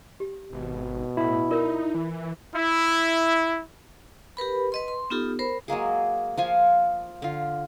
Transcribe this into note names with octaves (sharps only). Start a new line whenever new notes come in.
G4
G#1 B2
A2 E4 B5
D#4 F4 A#4 D5
E3
E4
G4 A#4 B4 B5
B4 D#5 C6
C6
B3 D#4 F4 G4 A4
A#4 C5 B5
F#3 G#3 A#3 G#4
F3 F4 G#5
D3 F4